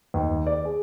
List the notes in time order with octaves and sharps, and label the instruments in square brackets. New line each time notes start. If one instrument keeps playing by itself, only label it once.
[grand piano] D#2
D5
G#4